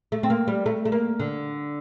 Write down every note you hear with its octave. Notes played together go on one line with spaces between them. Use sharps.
A3
C4
A#3
G3
A3
A3
A#3
D3